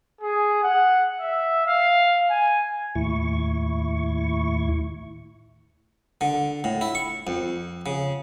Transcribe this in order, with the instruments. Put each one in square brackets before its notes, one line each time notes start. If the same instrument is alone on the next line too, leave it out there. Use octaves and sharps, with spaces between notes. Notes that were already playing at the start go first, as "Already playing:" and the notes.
[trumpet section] G#4
F#5
E5
F5
G#5
[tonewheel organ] D#2 A2 E4 C#6
[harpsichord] D3
A2
E4
C#6
F2
C#3